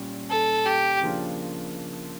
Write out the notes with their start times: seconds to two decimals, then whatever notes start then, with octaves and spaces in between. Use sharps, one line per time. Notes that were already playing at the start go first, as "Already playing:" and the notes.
Already playing: A#2 G3 C#4
0.31 A4
0.66 G4
1.01 C#3 F3 A#3 D4 F4